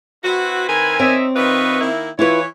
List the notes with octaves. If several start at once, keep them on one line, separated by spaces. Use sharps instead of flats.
C4 E4 F#4 B4
D#3 A#4 G#5
C4 D#4 C#5 D5 E5
D#3 F4 B4 D#5 E5 C#6
D#3 A#3 E4
E3 E4 F4 B4 C#5